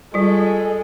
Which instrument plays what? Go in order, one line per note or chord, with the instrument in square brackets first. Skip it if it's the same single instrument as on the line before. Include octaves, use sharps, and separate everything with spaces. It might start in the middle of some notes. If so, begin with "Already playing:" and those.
[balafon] G3 F4 [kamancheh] G#3 A4